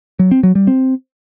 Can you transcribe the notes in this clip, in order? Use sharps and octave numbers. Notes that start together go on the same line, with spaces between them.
F#3
C4
F#3
G3
C4